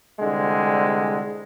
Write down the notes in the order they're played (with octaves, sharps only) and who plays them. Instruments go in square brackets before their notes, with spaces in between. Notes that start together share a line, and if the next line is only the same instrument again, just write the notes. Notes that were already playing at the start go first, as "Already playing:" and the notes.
[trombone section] C2 D3 G#3